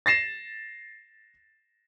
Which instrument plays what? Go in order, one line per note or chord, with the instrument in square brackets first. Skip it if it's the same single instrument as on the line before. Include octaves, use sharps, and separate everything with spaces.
[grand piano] A6 A#6 C7 E7